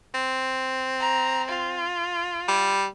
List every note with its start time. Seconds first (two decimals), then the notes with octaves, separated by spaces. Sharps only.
0.14 C4
1.00 A#5
1.49 F4
2.48 G3